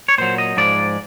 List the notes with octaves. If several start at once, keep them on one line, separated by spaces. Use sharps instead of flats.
C#5
A#2 F#3 C5
D#5
G#2 F3 G#3 D5